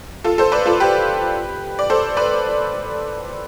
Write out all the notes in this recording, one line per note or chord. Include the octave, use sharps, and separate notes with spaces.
F4 A4
A4 C5
B4 D5
F4 A4
G4 B4
D5
A4 C5
B4 D5